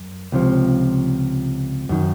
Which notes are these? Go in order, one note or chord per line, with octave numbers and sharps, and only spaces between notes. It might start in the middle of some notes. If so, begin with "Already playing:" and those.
Already playing: F#2
C#2 C3 F3
F#2 D#3